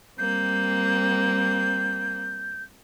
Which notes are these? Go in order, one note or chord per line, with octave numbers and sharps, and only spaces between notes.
G3 A#3 C4 G6